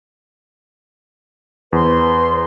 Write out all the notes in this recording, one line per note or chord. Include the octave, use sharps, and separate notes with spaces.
E2 B4 C5 C6